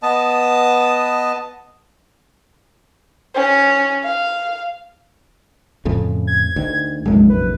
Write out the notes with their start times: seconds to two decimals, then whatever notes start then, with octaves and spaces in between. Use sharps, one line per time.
0.03 B3 D#5 A5
3.35 C#4
4.04 F5
5.85 F2 A2 C#3
6.27 G#6
6.56 D2 D#3
7.05 F1 A#1 F#2 G#3
7.30 B4